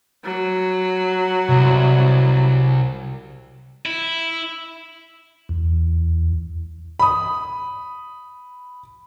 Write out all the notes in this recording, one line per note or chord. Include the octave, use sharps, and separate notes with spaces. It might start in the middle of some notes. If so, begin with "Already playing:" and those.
F#3
C2
E4
E2
B5 D#6